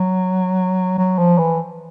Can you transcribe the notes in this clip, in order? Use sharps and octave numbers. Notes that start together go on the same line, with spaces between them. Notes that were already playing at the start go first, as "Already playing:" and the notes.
Already playing: F#3
F#3
F3
E3